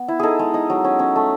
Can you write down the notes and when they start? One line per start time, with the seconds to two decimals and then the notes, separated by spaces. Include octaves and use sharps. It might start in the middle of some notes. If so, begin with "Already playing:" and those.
Already playing: B3
0.08 E4
0.20 D#4 G#4 A4
0.39 G#3
0.54 D#4
0.70 F#3
0.84 C#4
0.99 C#4
1.16 A3